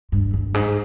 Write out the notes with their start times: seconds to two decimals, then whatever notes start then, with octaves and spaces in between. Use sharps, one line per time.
0.12 G2
0.33 G2
0.54 G#2